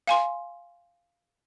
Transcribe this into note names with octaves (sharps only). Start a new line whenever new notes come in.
F5 G#5 C6